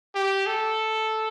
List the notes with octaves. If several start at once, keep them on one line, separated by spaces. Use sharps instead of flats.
G4
A4